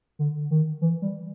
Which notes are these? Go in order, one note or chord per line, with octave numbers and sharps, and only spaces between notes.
D3
D#3
E3
G3